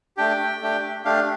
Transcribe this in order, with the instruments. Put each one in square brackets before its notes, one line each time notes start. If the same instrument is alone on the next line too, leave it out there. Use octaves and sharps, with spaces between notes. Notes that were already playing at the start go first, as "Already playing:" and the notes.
[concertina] A3 D4 G4 G5
A3 D4 G4
A3 D4 G4 F5